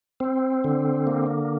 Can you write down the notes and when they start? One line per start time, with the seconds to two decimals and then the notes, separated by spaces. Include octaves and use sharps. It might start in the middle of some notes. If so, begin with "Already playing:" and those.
0.20 C4
0.64 D3
1.07 A#3